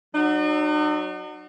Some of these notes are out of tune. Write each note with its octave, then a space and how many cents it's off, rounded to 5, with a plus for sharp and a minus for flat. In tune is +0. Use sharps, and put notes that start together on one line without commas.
F#3 +0 D#4 -45